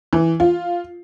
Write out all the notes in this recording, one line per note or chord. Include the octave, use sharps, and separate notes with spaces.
E3
F4